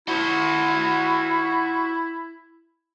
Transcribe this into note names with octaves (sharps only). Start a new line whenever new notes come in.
E4 F#4 C5